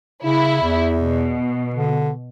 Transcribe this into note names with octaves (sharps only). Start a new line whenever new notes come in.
C#3 E4
E2
B2
D3